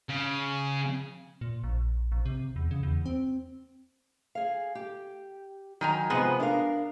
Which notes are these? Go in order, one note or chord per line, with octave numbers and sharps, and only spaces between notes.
C#3
A#2
A#1
A#1
C3
E2
C#3
E2
C4
G#4 F5
G4
D#3 F#3 G#5 A#5
C3 F3 G#3 B3 G#4
D4 A#4 F5